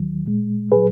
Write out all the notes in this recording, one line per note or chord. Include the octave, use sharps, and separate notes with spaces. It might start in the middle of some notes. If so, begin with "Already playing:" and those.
Already playing: D#2 D#3 F#3
A#2 G#3
A#2 F#3 G#4 B4